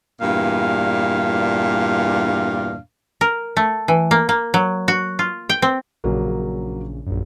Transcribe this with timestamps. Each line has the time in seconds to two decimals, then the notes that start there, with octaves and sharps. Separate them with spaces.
0.21 E2 G2 A#2 D4 F5
3.21 A#4
3.57 A3
3.88 E3
4.11 A#3
4.29 A#3
4.54 F#3
4.88 F#4
5.19 F4
5.49 G5
5.62 C4
6.04 A#1 C#3 F#3 A#3
7.06 A#1 F#2